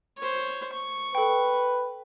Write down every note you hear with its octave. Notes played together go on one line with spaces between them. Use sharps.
C5 C#5
C#6
A4 B4 G5